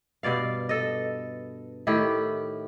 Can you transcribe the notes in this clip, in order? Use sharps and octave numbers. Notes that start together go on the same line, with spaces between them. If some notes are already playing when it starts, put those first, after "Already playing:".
G2 B2 D5 F5
A4 D#5
A2 D#3 E4 G4